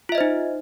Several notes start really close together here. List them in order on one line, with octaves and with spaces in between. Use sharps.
F4 E5 D#5 C5 D#4